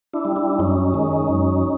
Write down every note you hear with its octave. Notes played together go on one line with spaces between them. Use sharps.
D4 E4
G3
D4 E4
F#2 C#4 D#4
D#3 G#3
F#2